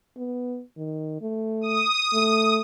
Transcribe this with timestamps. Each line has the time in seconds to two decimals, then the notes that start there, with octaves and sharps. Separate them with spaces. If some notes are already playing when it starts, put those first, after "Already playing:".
0.17 B3
0.77 D#3
1.22 A3
1.61 D#6
2.14 A3